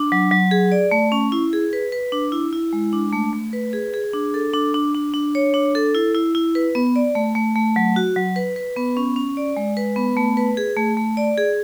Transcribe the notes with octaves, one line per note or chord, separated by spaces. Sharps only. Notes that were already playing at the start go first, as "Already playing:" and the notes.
Already playing: D4
F#3
F#3
G#4
D5
A3
C#4
E4
G#4
B4
B4
D4
E4
E4
G#3
D4
A3
A3
B4
G#4
G#4
D4
A4
D4
D4
D4
D4
C#5
D4
A4
E4
E4
E4
B4
B3
D5
A3
A3
A3
F#3
F#4
F#3
B4
B4
B3
C#4
C#4
D5
G#3
B4
B3
A3
B4
G#4
A3
A3
D5
G#4